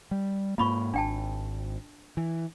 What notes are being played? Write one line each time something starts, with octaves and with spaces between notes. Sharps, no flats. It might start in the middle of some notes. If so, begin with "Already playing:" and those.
G3
G#2 A#3 F4 B5 C#6
G#1 D4 G5 A5
E3